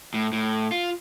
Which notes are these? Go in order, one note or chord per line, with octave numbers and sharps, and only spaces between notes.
A2
A2
F4